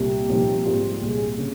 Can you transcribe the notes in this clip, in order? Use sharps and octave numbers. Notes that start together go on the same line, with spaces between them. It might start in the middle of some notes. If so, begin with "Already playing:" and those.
Already playing: C2 A#2 G3 G4
C2 A#2 F3 C4 D#4
G#2 G3 A#3 F4
C2 A#2 G3 G#4
C#3